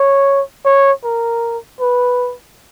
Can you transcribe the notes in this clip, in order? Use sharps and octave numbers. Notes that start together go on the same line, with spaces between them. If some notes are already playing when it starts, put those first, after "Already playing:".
Already playing: C#5
C#5
A#4
B4